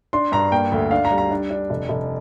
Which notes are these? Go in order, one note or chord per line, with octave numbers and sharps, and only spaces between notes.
D4 C6
G2 A#5
A#3 G5
D2
D4 F5
A#5
G3
A#5
D4
D4
F1
F1